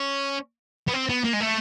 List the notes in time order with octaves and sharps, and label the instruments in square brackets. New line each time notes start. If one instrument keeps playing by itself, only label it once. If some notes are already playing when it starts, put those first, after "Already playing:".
Already playing: [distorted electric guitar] C#4
B3
C4
B3
A#3
G#3
A3